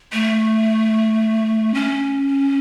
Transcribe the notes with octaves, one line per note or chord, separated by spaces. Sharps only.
A3
C#4